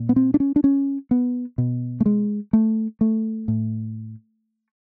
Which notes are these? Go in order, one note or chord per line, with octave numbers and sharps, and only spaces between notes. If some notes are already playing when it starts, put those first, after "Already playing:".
Already playing: A#2
B3
C4
D4
C#4
D4
C#4
B3
B2
A3
G#3
A3
A3
A2